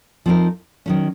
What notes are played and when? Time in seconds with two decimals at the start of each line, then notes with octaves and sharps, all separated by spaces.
0.26 F3 C4 D#4 A#4
0.86 D#3 F#3 C#4